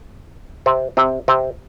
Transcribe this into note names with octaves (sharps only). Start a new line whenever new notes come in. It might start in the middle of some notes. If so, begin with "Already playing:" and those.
C3 C4
C3 C4
C3 C4